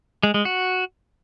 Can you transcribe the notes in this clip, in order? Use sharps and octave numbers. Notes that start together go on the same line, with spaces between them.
G#3
G#3
F#4